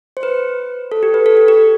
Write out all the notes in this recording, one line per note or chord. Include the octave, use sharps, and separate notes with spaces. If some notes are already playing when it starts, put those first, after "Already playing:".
C5
B4
A4
G4
B4
A4
G4
G4